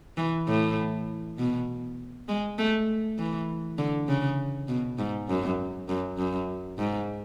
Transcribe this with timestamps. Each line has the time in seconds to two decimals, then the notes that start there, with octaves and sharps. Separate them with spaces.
0.17 E3
0.48 A2
1.38 B2
2.28 G#3
2.58 A3
3.19 E3
3.78 D3
4.08 C#3
4.68 B2
4.98 G#2
5.29 F#2
5.89 F#2
6.18 F#2
6.79 G#2